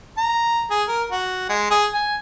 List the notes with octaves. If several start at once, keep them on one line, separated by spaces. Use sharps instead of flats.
A#5
G#4
A#4
F#4
G#3
G#4
G#5